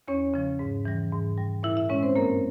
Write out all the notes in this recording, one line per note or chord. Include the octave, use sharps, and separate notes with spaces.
E2 C#4 C#5
C#3 F3
G#2
E3 G3
G#2
G3
A#2 E4 E5
E4 E5
G#3 C#4 C#5
C4 C5
G2 A#3 A#4